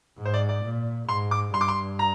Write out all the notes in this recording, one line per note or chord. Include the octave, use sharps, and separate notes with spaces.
G#2
C5
D5
D5
A#2
G#2 C6
D6
G2 C6
D6
C6
A#5